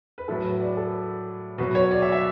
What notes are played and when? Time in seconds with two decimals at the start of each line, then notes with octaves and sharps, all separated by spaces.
0.18 B4
0.28 A2 F#3 A4
0.45 B4
0.61 D5
0.77 A4
1.58 B2 F#3 B4
1.75 C#5
1.91 D5
2.02 E5
2.12 E5